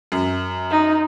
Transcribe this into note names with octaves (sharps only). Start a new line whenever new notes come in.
F#2
D#4